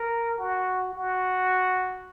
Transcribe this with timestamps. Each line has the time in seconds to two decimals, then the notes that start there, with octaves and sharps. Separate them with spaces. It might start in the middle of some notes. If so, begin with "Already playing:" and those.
Already playing: A#4
0.38 F#4
0.93 F#4